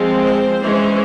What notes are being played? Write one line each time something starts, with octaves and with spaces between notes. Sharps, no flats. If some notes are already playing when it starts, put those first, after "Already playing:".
Already playing: F3 G#3 C4
C5
E3 G#3 C#4